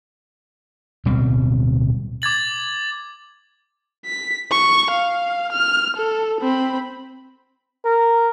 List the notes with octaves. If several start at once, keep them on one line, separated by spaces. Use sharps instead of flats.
D1 B2 G3 C4
D6 G#6 A6 F#7
B6
C#6
F5
F6
A4
C4 B5
A#4